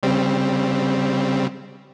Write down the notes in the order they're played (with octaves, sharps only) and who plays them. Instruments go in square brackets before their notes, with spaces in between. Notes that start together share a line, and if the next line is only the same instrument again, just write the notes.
[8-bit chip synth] C#3 G3 C4